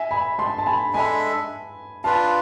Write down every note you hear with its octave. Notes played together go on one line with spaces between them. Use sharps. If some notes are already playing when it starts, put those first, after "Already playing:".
Already playing: E5 G#5
G#5 B5
A5 C6
A5
G#5 B5
G#3 D4 A4 E5 G#5 B5
D4 F4 B4 F5 A5